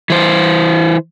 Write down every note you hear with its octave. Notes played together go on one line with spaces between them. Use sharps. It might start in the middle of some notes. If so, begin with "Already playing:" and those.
E3 C5